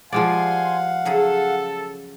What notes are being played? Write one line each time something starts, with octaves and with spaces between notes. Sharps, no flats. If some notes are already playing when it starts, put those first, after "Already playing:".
F3 G3 G#3 D5 F5 F#5 G#5 C6
C#3 F#3 G#4 A4